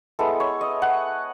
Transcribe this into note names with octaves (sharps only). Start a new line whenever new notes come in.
G#3 B3 E4 A4
C#5
D#5
F#5